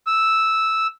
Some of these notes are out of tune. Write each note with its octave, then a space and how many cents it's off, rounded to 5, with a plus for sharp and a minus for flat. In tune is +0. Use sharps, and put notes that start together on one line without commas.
E6 -5